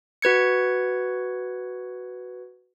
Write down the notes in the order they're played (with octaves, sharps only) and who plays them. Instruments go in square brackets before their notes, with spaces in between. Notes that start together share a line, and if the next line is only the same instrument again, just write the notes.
[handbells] F#4 B4 G#6 C#7